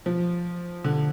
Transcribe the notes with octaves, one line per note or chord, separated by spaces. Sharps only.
F3
D3